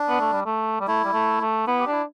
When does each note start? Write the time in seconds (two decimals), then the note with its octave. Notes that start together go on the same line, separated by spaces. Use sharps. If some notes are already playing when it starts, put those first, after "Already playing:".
Already playing: D4
0.09 B3
0.20 A3
0.32 G3
0.46 A3
0.80 G3
0.87 A3 E4
1.05 G3
1.13 A3
1.41 A3
1.67 B3 E4
1.79 G4
1.87 D4
1.92 E4